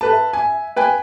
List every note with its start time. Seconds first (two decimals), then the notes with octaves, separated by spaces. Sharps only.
0.01 A4 B4 A5
0.13 E5
0.33 G#5
0.76 B4 G5 G#5